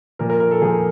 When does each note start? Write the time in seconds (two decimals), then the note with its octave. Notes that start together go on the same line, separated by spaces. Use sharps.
0.19 A#2 F3 A#4
0.30 A#4
0.40 A#4
0.51 A4
0.62 A#2 F3 G#4